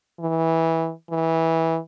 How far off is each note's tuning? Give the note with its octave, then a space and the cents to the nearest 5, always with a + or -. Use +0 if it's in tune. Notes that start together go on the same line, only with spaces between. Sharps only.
E3 -15
E3 -15